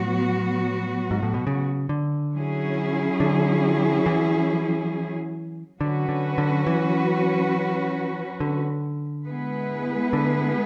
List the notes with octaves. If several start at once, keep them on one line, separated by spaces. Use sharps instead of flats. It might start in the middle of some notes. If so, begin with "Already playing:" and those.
Already playing: A2 F#3 B3 F#4
G#2
A2
B2
C#3
D3
F#3 C#4 E4 G#4
D3
E3
D3 F#3 C#4 F#4 B4
D3
D3
E3
D3
G#3 B3 E4 G#4 B4
D3